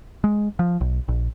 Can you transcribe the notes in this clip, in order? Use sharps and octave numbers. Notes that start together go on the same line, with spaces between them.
G#3
F3
B1
A#1